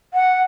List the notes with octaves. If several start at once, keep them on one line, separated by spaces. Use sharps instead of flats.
F#5